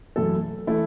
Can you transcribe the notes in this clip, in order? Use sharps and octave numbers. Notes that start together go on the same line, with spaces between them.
F#2 E3 A3 E4 A4
E3 A3 E4 A4